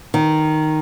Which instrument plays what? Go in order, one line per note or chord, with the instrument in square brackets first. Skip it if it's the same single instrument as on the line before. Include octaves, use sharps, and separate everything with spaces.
[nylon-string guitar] D#3